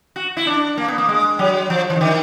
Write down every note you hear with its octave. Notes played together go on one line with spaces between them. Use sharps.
F#4
E4
D4
A#3
B3
A#3
G#3
F#3
F3
E3
D3
D#3